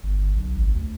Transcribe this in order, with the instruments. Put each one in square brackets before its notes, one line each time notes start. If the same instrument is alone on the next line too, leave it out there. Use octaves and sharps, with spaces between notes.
[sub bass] G1
B1
G#1
D2